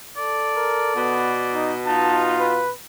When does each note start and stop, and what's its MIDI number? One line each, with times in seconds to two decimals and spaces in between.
0.17 1.27 69
0.17 1.77 74
0.57 0.92 70
0.96 2.74 47
0.96 1.34 59
1.54 1.74 63
1.86 2.55 63
1.86 2.63 65
1.86 2.21 81
2.40 2.72 71